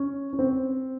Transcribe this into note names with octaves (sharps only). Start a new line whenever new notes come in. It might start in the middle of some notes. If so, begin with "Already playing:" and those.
Already playing: C#4
C#4
C4